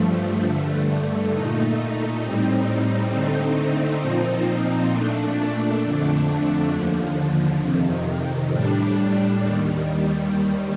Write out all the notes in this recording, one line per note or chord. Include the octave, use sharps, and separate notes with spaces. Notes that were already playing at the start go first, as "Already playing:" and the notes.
Already playing: G2 F3 A3
G2 D3 A3
A#2 A3 D#4
A2 G3 C4 D#4
D3 A3 C4 D#4
A#2 F3 C4 D#4
A#2 A3 D4
F2 D3 A3 D4
D#2 D3 F3
F2 C3 D#3
A2 G3 D4
D#2 D#3 G3